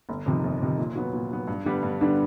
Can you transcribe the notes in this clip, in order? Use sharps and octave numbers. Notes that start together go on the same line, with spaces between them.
G1
F2 C3 D#3
G1
F2 C3 D#3
A#2
F#3 B3
A#2
F#3 B3
G2
D3 G3 B3 D4
G2
D3 G3 B3 D4